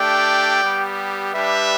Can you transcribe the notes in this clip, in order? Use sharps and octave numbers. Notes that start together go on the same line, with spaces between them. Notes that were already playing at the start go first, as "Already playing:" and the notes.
Already playing: A3 D4 G4 D5 G5
G3 B3 G4
G3 D4 G4 B4 E5